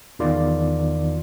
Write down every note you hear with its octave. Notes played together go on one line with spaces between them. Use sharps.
E2 D#3 F4 D5